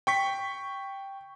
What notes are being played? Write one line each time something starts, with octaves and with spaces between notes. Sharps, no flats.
G5 C#6 B6